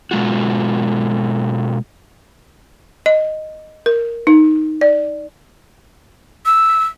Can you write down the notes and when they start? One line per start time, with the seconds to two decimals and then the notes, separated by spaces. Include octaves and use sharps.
0.11 B2 G#3 F4 F#4
3.06 D#5
3.86 A#4
4.27 D#4
4.81 D5
6.46 E6